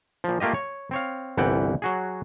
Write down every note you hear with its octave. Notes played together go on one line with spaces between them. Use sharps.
A#2 F3
A3 A#3 F4 G4 D#5
C#5
C4 C#5 F5
G1 C2 E3 F#5 G5
F#3 F#4 G#4